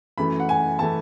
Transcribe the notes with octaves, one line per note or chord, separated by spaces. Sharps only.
F#2 E3 A3 B5
F#5
G#5
E3 A3 A5